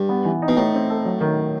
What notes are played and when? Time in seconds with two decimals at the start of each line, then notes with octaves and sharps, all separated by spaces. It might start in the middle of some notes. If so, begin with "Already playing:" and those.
Already playing: G2
0.09 B3
0.25 E3
0.42 D#4
0.48 B2
0.57 A2 D#4
0.74 C4
0.90 A4
1.05 F#3
1.21 D#3